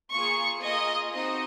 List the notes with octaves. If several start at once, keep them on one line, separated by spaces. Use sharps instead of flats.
A#3 F4 G#4 C#6
A#3 F4 G#4 D#5
C4 D#4 F#4 D#5